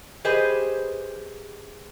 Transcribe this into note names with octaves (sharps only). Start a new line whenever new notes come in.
G4 G#4 B4 C5 D#5